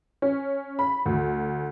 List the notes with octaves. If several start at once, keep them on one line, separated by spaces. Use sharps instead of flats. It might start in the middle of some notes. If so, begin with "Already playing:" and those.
C#4
B5
D2